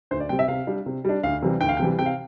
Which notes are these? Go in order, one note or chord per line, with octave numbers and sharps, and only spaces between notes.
D2 C5
D5
C3 G3 C4 G5
E5
C3 F5
G3 D4
C3
G3 D4
D2 F5
C3 E3 G3
D2 G5
F5
G5
C3 E3 G3
C3 G5
F5